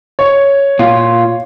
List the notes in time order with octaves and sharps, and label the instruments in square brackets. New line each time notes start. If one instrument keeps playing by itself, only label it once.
[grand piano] C#5
[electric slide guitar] A#2 F4